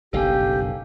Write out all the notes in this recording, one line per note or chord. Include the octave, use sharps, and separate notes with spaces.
F#1 B1 G2 G4 A4 F5 G#5